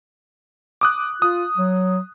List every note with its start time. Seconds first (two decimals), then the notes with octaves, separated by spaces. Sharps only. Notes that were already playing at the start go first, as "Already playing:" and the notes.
0.81 D6 D#6 F#6
1.22 F4 D#6
1.57 F#3